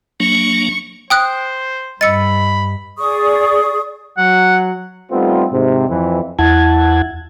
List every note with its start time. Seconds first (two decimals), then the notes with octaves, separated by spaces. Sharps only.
0.20 F#3 A#3 D4 C#6
1.10 C5 G5 D#6 F#6
2.01 G2 D#5 B5 E6 A6 C#7
2.98 G#4 D5 C#6 D#6
4.17 F#3 F#5
5.11 G3 A3 B3 C4 D#4 F4
5.51 G#2 C3
5.89 F2 E3
6.39 E2 E4 F#5 A5 G#6